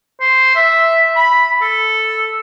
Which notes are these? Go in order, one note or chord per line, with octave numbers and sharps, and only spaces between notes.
C5
E5
B5
A4